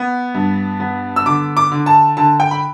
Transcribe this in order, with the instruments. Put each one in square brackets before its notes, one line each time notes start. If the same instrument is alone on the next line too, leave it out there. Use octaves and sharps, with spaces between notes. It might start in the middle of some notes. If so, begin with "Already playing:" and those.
Already playing: [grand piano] B3
G2
B3
E6
D3 D6
D6
D3
A5
D3 A5
G5
B5